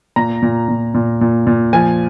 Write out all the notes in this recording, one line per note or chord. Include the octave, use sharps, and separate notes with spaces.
A#2 A#5
A#2
A#2
A#2
A#2
A#2
F3 G#5